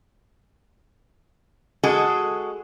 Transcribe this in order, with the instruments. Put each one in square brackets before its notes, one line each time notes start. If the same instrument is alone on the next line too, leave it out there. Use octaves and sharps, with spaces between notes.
[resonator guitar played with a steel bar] G#3 F#4 G#4 A4